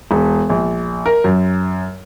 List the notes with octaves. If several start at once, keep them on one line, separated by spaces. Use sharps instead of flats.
E1
A#1
A#4
F#2